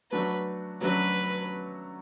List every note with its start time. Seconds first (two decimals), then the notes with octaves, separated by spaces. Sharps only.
0.11 F#3 A3 D4 F#4 B4
0.81 F#3 A3 D4 F#4 B4